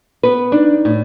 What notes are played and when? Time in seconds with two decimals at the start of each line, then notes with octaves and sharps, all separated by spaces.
0.23 B3 B4
0.52 D4 D#4
0.85 A2